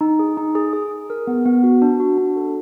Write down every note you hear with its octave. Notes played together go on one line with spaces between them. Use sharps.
D#4
G#4
D#4
G#4
G#4
G#4
A#4
B3
B3
F#4
D4
F#4
D4
A4